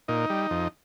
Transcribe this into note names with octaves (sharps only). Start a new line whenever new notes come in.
A#2 D#4
G3
F2